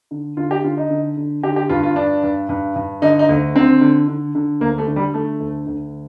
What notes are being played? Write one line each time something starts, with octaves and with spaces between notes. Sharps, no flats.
D3
D3 F4
G4
D3 F4
D#4
D3
D3
D3 G4
G4
G2 F4
F4
G2 D4
G2
G2
G2
D3 D#4
D#4
D2
D3 C4
D3
D3
D3
D2 A#3
A3
D3
G3
D3 A3
D2
D2